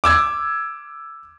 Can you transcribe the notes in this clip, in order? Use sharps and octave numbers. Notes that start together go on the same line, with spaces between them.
D6 E6 G#6